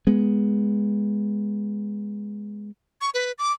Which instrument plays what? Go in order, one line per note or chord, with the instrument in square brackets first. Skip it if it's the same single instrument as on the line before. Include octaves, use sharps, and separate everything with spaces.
[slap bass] G#3 B3
[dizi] C#6
B4
D6